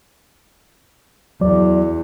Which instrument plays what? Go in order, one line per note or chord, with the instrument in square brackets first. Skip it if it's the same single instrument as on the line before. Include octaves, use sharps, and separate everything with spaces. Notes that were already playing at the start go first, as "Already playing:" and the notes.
[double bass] E2 [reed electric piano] F#3 D5